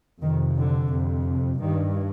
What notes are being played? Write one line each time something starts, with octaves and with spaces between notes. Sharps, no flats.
F2 C3 D#3
D3
F2 C3
G2 D#3